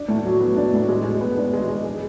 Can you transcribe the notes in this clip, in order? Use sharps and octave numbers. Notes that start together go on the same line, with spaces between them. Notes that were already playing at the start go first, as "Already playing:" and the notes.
Already playing: D4
A2
F#3
B3
D4
A2
G#3
G#3
B3
D4
G#3
G#3
G#4